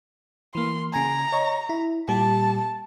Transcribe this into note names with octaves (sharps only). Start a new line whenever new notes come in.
E3 A#3 C6
C#3 G#5 A#5
C#5 D#5 C#6
E4
A#2 G3 G4 A5